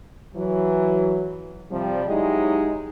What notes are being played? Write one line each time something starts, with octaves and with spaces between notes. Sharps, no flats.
E3 F#3
C3 F3 G3
F#3 G#3 D#4 E4 G4